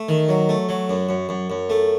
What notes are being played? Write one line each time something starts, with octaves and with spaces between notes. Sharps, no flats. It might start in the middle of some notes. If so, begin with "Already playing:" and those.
Already playing: A3
D#3
F#3
A3
F#3
F#2
F#2
F#2
F#2
A3